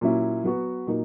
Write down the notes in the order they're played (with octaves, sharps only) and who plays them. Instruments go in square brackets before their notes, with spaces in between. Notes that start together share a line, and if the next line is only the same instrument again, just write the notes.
[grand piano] A#2 F#3 C#4 E4
F#3 B3 F#4
A#2 F#3 A#3 D#4 A#4